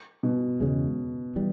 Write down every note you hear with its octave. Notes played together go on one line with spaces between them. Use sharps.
B2
E2 C#3 G#3
E3 G3